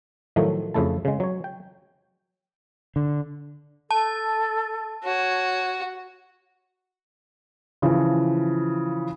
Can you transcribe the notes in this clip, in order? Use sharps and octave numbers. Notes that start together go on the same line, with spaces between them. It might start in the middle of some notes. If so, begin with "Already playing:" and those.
A2 D#3 F3 F#3 A3
F2 C#3 A3 E4 A5
C#3 G#3
F#3 C#5
G5
D3
A4 A5
F#4 C#5
C#3 E3 F3